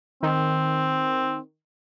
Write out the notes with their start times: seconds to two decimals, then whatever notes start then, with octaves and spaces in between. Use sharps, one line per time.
0.23 D#3 C4